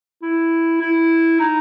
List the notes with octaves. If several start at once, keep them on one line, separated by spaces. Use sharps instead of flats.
E4
E4
D#4